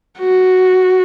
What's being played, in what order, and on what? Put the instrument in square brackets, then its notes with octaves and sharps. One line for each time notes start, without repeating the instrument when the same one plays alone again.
[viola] F#4